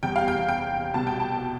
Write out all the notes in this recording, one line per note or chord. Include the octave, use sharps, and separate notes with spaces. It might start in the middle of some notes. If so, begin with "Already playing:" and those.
E2 C3 G3 G5
F5
G5
G5
C2 B2 G3 A5
G5
A5